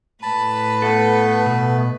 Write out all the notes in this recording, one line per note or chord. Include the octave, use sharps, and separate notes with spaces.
A2 B4 A5 B5
A3 B3 A4
B2